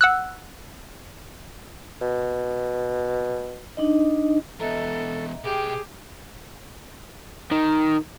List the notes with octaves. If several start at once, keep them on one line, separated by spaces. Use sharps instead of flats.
F#5 E6 F#6
B2
D4 D#4 D#5
B2 E3 A4 D#5 E5 A#5
B2 G4 G#4 G5
D#3